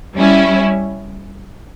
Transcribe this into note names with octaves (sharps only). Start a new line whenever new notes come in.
G3 C#4 E4